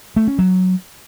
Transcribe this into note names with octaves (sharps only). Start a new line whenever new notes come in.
A3
C#4
F#3